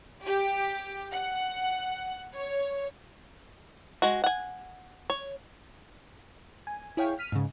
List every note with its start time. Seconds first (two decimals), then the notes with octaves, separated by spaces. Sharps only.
0.25 G4
1.11 F#5
2.34 C#5
4.02 G#3 F#4
4.24 F#5 G#5
5.10 C#5
6.67 G#5
6.97 E4 G#4 C#5 F5 G5
7.18 F6 B6 D#7
7.32 G#2 C#3